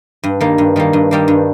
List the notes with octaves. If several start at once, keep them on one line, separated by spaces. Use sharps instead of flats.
G2
D#3 G3 A#3
G2
D#3 G3 A#3
G2
D#3 G3 A#3
G2